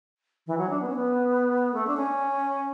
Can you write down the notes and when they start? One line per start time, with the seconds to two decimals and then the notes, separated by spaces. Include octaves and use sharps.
0.47 E3
0.58 F#3
0.70 D4
0.82 B3
0.89 C#4
0.96 B3
1.74 A3
1.87 D4
1.97 C#4